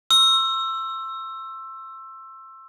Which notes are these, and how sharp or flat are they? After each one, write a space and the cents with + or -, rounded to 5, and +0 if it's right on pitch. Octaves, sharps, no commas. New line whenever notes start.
C6 +35 E6 +15